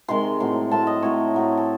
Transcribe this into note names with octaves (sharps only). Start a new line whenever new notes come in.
C3 D#3 G#3 C6
A2 F#3 A3 C4
A2 F#3 A3 C4 A5
D#5
A2 F#3 A3 C4 C#5
A2 F#3 A3 C4
A4